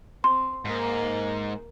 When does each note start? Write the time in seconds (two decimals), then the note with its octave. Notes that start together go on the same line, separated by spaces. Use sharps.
0.24 C4 C6
0.65 G#2 A#3